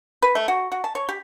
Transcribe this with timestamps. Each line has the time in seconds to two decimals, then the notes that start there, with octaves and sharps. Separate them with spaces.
0.22 B4
0.35 A3
0.48 F#4
0.72 F#4
0.84 A5
0.95 C#5
1.09 G4